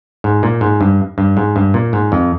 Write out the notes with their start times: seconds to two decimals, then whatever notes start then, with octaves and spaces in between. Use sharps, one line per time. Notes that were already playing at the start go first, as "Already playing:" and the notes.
0.24 G#2
0.43 A#2
0.61 G#2
0.81 G2
1.18 G2
1.37 G#2
1.56 G2
1.74 A#2
1.93 G#2
2.12 F2